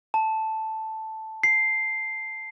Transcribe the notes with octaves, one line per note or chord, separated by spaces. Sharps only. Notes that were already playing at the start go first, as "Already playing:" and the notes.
A5
C7